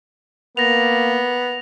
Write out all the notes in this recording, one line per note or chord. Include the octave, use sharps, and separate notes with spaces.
A#3 B3 A#6 F7